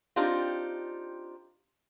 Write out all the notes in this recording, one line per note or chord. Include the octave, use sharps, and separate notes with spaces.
C4 D4 D#4 F4 G4